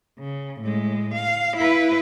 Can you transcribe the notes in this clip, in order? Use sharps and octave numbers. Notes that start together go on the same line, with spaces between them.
C#3
A2 G#3
F5
E4 B4